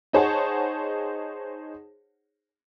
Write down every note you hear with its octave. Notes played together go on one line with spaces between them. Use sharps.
D#4 G#4 C5 C#5 F#5 A5